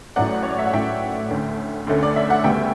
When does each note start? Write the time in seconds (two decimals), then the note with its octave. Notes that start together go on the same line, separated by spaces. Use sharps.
0.16 A1 A2 F#3 A3 C#4 D5 F#5
0.43 C#5
0.51 D5
0.59 E5
0.66 F#5
0.73 A1 A2 F#3 A3 C#4 E5 G5
1.30 D2 D3 A3 C#4
1.87 D2 D3 A3 C#4
2.03 D5
2.16 E5
2.30 F#5
2.44 D2 C#3 G3 B3 E5 G5